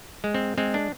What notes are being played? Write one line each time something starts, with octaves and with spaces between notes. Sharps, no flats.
G#3
C4
G#3 C4
D4